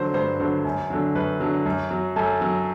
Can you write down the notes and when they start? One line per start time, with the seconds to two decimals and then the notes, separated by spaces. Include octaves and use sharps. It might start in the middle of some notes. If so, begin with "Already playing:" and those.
Already playing: D3 F#3 C5
0.14 G2 C5
0.40 D3 F#3 C5
0.65 F#2
0.90 D3 F#3
1.15 F#2 B4
1.40 D3 F#3
1.66 F#2
1.91 F#3
2.16 F#2 A4
2.41 F#3